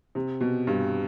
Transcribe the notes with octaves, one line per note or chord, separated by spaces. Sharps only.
C3
B2
G2